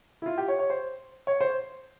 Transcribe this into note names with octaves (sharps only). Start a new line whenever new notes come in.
E4
F4
G4
C#5
C#5
C5
C#5
C5